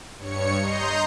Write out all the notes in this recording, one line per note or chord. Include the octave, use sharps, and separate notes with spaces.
G2 C#5 C#7
D#5 A#5 C6 G6